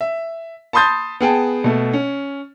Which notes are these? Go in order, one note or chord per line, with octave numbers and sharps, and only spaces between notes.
E5
A5 B5 C6 D#6 G6 A6
B3 G#4 G5 A5
B2 A3
C#4